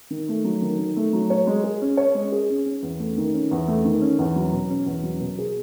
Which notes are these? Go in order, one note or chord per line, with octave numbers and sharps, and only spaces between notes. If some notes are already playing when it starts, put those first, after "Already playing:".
D#3
A3
F#3
D#3
D#3
A3
F#3
C#5
G#3
G#4
C#4
C#5
G#3
G#4
C#4
C#4
E2
A3
D#3
C#4
E2
A3
D#3
C#4
E2
F#3
B2
C#4
E2
F#3
B2
G#4